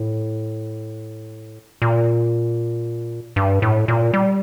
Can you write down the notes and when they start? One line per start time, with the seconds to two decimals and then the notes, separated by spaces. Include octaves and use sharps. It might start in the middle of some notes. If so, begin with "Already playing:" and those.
Already playing: A2
1.82 A#2
3.36 G2
3.62 A2
3.88 A#2
4.13 G3